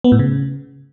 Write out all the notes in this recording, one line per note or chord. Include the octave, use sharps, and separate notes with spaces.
B3
A2
C#3